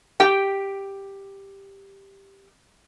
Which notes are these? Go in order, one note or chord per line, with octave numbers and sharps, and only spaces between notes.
G4 G5